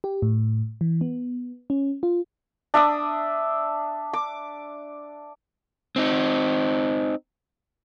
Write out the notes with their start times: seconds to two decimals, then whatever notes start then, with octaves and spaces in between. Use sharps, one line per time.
0.04 G4
0.22 A2
0.81 E3
1.01 B3
1.70 C#4
2.03 F4
2.74 D4 E5 D6 D#6
4.13 D6
5.96 C4 D#4